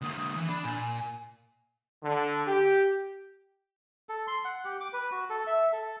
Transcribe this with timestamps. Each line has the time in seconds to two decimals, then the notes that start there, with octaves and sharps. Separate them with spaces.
0.02 D3 A#3 D#6
0.36 E3
0.48 D4 B5
0.65 A#2 G#5
2.03 D3
2.47 G4
4.09 A4
4.27 C6
4.45 F#5
4.65 G4
4.81 D6
4.93 B4
5.11 F#4
5.30 A4
5.47 E5
5.72 A4